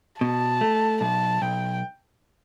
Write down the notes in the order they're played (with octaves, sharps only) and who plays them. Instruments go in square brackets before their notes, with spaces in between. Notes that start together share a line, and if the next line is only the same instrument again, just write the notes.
[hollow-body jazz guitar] B2 [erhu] A5
[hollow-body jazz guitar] A3
[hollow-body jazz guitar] B1 [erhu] A5
[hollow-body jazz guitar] B1 [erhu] G5